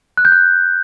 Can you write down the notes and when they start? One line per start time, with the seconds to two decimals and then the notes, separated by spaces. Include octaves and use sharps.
0.17 F#6
0.25 G6
0.32 F#6